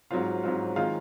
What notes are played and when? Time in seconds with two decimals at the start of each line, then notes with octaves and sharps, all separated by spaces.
0.11 G#2 F#3 C4 F4 F5
0.43 G#2 F#3 C4 F4
0.76 D#3 G#3 C4 F4 F5